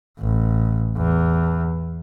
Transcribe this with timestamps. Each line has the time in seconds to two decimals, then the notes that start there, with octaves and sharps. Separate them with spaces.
0.20 A1
0.97 E2